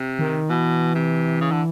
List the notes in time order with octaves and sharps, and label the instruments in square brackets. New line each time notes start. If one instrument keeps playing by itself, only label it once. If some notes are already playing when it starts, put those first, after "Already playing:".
Already playing: [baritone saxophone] C3
[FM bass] D#3
[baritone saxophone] B2 [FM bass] E3
[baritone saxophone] C3
C#3
D3